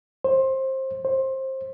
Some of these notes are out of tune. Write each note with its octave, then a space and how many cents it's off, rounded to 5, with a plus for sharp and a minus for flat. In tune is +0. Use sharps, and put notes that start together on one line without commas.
C5 +20
C5 +20